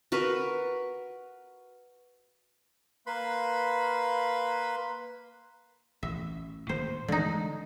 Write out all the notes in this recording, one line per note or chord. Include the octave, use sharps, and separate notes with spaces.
F#4 A#4 B4
A#3 B4 B5 C6
A1 E5
A2 D#3 A#3 C5
D3 E3 G#3 A3 D#4